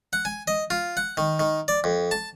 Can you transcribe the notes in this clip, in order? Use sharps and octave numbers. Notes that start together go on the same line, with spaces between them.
F#5
G#5
D#5
F4
F#5
D#3
D#3
D5
F2
A5